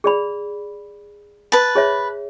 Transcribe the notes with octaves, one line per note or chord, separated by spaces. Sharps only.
G#4 D5 B5
B4 A5
G#4 C#5 E5